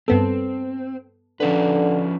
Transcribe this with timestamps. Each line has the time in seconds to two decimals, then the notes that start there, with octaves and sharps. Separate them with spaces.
0.08 G2 B3 C4 A4
1.40 D3 F3 C#4 B4